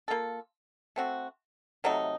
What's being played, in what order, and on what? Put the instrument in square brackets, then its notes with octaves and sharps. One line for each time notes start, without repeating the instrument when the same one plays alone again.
[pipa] A#3 F4 A4
A3 C4 F#4
C3 F#3 A3 D#4